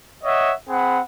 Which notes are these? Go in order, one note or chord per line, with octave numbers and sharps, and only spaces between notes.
C#5 D#5 E5 F#5
C4 G#4 F#5 B5